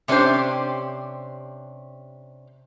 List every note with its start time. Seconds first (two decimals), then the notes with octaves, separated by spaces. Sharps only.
0.08 C3 C#4 D4 G4 C5